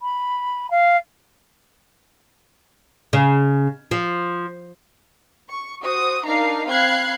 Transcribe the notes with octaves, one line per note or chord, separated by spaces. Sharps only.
B5
F5
C#3
F3
C#6
F#4 C5 D#6
D4 D#4 A#4 F5 A#5 C7
C4 F5 B5 F#6 G#6 C7